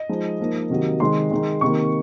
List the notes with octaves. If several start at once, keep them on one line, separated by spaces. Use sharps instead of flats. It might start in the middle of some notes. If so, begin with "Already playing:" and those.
Already playing: D#5
F3 G#3 D#4
F3 A#3 D#4
C3 D#3 F#3 A#3
C3 D#3 G#3 C4 D#4 C6
D#3 G#3 D#4
C3 D#3 A#3 C#6